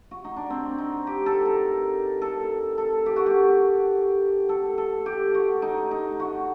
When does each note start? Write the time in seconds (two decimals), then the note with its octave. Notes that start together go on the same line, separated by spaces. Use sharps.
0.11 F#4
0.24 D#4
0.37 D4
0.50 C4
0.78 D#4
1.07 G4
1.26 A4
1.46 A#4
2.22 A4
2.78 A4
3.06 G4
3.16 F#4
3.26 G4
4.49 A4
4.78 A4
5.06 G4
5.34 F#4
5.62 D#4
5.91 D#4
6.20 F#4